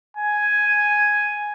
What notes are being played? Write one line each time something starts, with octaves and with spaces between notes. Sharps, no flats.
G#5